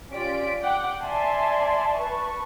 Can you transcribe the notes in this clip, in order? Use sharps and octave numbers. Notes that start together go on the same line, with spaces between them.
C#4 F4 G4 D5 B6 D7
F#5 G5 D6
D5 E5 G#5 A5 C6
B4 A5 C#6